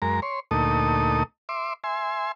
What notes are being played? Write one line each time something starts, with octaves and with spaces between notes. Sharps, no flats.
F#2 G#3 A#4 A#5
C#5 C6
D2 A#2 A3 D#4 A4 D#6
E5 C6 D6
E5 G#5 C6